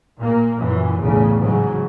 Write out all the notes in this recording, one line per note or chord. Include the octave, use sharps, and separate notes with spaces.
A#2 A#3
F#2 A#2 E3
B1 E2 A2 C#3 A3
G#2 C#3 F#3